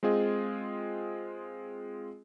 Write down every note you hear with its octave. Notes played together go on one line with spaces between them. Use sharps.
G#3 C4 F4 G#4 D#5